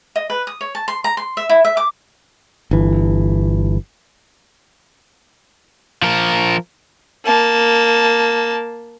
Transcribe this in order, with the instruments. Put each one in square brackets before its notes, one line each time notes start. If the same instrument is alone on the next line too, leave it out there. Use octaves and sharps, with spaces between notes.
[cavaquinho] D#5
B4
D#6
C#5
A5
C6
A#5
C6
E5
E4
E5
D6
[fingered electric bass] G1 E3
[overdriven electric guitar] F3 A#4
[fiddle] A#3 A5